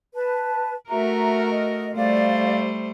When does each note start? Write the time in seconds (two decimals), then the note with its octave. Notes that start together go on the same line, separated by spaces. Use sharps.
0.14 B4 A5
0.89 A3 F#4 A#4 E5 A#5
1.51 D#5
1.95 G3 A3 C5 D5 F5